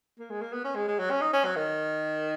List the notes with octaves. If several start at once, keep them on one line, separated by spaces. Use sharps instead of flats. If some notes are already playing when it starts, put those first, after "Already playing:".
A#3
G#3
A#3
B3
C#4
G#3
G#3
F#3
C#4
D#4
C#4
F#3
D#3